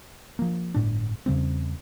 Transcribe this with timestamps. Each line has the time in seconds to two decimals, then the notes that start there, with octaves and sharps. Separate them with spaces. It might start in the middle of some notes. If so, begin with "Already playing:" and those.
0.39 F3 A#3
0.74 G1 A2 D4
1.26 E2 C#3 G3 C4